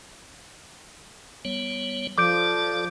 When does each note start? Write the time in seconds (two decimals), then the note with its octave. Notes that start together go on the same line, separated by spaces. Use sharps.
1.45 G3 B3 C#5
2.18 F3 A4 D5 D6 G6 D7